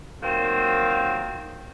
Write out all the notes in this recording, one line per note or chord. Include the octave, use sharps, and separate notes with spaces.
D#3 F#3 A#3 C4 F4